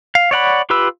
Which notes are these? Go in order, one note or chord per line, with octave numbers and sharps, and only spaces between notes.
F5
C#5 D5 F#5 B5
F4 G4 B4 B5 E6